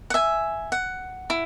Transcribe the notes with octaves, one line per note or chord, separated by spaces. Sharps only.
F#5
E5 G#5
F#5
E4